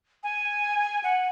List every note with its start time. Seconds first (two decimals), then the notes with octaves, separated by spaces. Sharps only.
0.23 G#5
1.04 F#5